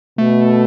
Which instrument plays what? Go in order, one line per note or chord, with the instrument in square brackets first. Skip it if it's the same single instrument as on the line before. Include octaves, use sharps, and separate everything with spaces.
[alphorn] B2 [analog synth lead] A3